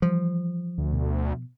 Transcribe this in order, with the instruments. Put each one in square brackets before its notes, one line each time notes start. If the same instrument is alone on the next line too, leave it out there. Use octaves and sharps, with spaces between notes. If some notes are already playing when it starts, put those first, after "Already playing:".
[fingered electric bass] E3 G3 [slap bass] F3
[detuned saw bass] D2
[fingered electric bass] B2